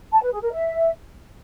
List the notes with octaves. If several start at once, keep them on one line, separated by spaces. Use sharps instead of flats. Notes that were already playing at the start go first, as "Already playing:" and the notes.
A5
B4
G#4
A#4
E5